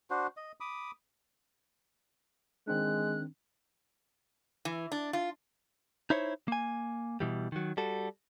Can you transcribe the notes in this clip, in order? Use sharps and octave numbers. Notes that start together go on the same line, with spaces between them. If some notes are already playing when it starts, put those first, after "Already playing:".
D4 F#4 C5
D#5
B5 D6 D#6
D#3 G#3 C4 D4 F#6
E3
D4
F4
D#4 E4 C5 C#5
A#3 G#5
B2 E3 G3
D#3 F#3
G3 F#4 A4